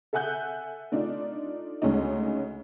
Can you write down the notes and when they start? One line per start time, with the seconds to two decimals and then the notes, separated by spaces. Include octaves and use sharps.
0.13 A4 E5 F#5 G#5 F#6 G6
0.92 A3 D4 D#4 F4
1.82 D2 C#3 G#3 C#4 D#4